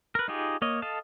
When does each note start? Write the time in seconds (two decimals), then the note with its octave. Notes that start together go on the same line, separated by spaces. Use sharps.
0.15 A#4 B4
0.28 D#4 F4 G4 G#4
0.62 A#3 C#5 D#5
0.82 A4 D#5 F5 A5